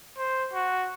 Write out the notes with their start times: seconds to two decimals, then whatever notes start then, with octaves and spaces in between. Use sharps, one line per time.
0.17 C5
0.53 F#4